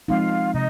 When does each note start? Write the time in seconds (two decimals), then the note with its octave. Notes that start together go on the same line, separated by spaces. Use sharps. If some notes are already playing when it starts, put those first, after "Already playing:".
0.08 F3 G#3 C4 D#4 F4 F5
0.54 C3 D#4 D#5